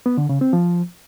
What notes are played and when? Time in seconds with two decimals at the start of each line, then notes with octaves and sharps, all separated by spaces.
0.06 B3
0.18 D3
0.29 C#3
0.41 C4
0.53 F3